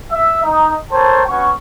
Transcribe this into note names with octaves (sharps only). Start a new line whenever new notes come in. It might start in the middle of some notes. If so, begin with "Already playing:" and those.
E5
D#4
A4 A#4 C5 C#5 G5 A5
B3 C#4 F#4 C#6